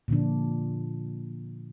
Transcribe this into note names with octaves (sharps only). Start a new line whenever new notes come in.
A#2 D3 F3 D4